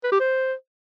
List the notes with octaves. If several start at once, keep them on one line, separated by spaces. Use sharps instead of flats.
B4
G4
C5